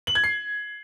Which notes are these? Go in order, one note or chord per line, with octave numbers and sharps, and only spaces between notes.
F#7
G#6
C7